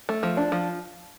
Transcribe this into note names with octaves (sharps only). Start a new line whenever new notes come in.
A3
F3
D4
F3